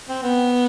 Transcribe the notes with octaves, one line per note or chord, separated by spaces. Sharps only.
C4
B3